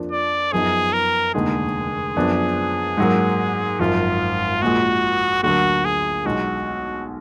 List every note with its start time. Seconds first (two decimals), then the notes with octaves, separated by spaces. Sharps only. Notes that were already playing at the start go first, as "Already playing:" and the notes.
Already playing: F2 F3 A#3 D4
0.12 D5
0.52 F#2 F3 B3 D#4 G#4
0.93 A#4
1.35 F1 D#2 D3 G#3 D#4 G#4
2.16 F#2 F3 B3 D4
2.97 G#2 F#3 A#3
3.79 G#1 F#2 F3 F4
4.62 A#1 A#2 G#3 F#4
5.43 D2 D3 F#3 A#3 F#4
5.85 G#4
6.25 B1 B2 G#3 F#4